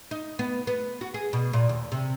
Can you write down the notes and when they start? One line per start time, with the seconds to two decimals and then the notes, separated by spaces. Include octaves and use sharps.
0.11 D#4
0.39 B3
0.67 B3
1.01 F#4
1.14 G#4
1.33 B2
1.53 A#2
1.69 D#2
1.92 C3